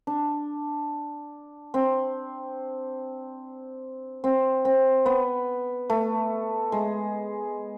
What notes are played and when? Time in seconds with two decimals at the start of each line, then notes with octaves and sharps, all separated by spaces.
0.07 D4
1.74 C4
4.24 C4
4.65 C4
5.06 B3
5.90 A3
6.72 G#3